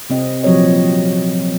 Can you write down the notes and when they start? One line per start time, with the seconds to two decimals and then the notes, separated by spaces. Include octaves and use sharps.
0.10 C3 C4 D#5
0.43 A#2 F3 F#3 C4 C#5 D#5